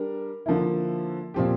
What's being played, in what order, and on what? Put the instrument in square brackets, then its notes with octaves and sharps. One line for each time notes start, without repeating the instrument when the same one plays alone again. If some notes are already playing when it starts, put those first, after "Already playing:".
Already playing: [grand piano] G3 D4 A#4
D3 F3 A#3 E4
A#2 F3 C4 G4